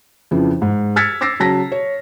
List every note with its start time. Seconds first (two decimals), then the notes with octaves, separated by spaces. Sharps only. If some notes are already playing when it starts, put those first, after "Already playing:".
0.31 F2 C#3 E3 F3
0.62 G#2
0.96 E6 F6 G#6 A6 B6 C#7
1.21 D6 E6 A6 A#6 C7
1.40 C#3 F#3 A5 A#6 B6
1.72 C#5